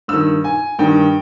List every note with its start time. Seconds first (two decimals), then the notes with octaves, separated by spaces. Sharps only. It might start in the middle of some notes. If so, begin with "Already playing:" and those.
0.08 G2 D#3 E6
0.44 G#5
0.79 G2 D#3 G5